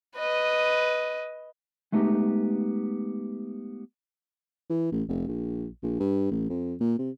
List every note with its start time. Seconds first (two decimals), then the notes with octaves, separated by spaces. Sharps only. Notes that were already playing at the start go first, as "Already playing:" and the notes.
0.16 B4 D#5
1.92 G#3 A3 B3 D#4 G4
4.69 E3
4.92 A1
5.08 F1
5.28 A#1
5.83 A#1
6.00 G2
6.31 A1
6.49 F2
6.80 A#2
6.99 C3